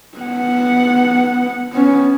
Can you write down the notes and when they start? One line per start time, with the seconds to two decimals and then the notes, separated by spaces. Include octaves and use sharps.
0.18 B3 F#5
1.73 B3 C#4